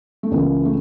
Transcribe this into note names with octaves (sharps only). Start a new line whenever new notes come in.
A3
C#2 C#3 E3 A#3
A3